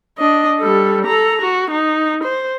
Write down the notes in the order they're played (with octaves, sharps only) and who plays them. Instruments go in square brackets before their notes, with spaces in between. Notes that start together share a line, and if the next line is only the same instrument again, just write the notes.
[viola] D4 D#5
G3 A4
A4 A#5
F#4
D#4
C5